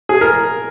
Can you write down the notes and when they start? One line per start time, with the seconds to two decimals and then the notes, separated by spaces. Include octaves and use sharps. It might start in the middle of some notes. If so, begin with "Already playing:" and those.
0.09 G#4
0.21 A#4